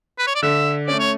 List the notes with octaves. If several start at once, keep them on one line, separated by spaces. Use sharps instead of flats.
B4
C#5
D5
D3 E5
A3 C#4 D5
C#5